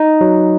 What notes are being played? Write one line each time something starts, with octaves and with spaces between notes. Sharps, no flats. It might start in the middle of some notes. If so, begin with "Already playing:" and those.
Already playing: D#4
F#3